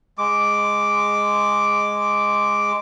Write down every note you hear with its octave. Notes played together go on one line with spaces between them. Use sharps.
G#3 D6